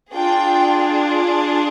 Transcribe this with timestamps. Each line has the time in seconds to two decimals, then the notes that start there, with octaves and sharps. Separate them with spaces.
0.12 D4 F4 G#4 G5